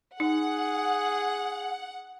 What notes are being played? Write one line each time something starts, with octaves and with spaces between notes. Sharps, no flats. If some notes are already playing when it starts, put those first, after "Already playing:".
D#4 G#4 F#5